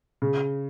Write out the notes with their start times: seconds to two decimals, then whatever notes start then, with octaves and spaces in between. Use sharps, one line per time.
0.22 C#3